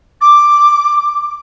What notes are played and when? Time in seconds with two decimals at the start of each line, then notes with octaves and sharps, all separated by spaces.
0.21 D6